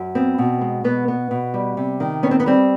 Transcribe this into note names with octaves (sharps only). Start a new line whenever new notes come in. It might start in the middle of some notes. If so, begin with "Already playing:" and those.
Already playing: F#2
B3 C4
B2
G#3
B2 B3
B3
B2
G3
C3
D#3
B3 C#4
C4
B3
G3 C4